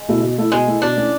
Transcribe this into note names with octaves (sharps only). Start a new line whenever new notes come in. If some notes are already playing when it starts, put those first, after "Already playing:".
Already playing: G#3
B2 A3 E4
B2
A3 E4
B2 G#3
A3 E4
B2 D4
A3 C#4 E4